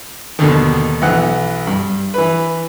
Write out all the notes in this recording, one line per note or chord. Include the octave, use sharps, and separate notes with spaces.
D#2 B2 D3 D#3
B1 E3 F#5 F#6
G2
E3 B4